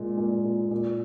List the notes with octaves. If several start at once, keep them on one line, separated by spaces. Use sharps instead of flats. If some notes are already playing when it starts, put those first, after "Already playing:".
Already playing: A#2 G#3
A#2
A#2
A#2